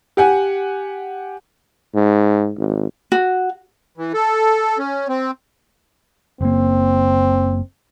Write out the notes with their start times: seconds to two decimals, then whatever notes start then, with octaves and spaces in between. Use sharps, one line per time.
0.17 G4 F#5 G#5
1.94 G#2
2.57 G#1
3.12 F#4
3.98 E3
4.14 A4
4.78 C#4
5.09 C4
6.41 F#1 A#3 C4